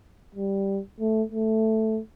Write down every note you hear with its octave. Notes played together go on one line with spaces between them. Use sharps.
G3
A3
A3